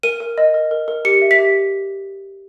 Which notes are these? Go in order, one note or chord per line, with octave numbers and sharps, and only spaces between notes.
A#4 D#7
A#4
D#5
A#4
A#4
A#4
G4 C#7
E5
B6
G4